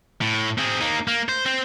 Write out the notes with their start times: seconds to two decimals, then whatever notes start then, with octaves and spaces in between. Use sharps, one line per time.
0.21 A2
0.58 C4 G#4
0.81 A#3 D#4
1.08 A#3
1.29 C5
1.46 C4 C5